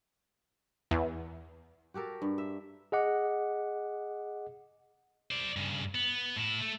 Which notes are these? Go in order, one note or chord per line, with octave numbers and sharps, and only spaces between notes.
E2
F#4 G4 A4 A#4
G2
E5
G#4 D#5 F#5 D6
C5 D5
G2 C#3
B3
A2 E4
A3